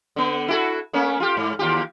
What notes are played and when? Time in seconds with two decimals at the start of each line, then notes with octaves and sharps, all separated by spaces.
0.16 D3 B3
0.48 E4 F#4 A4
0.93 A3 A#3 C#4
1.20 F4 G4
1.37 G#2
1.59 D#2 F4 G4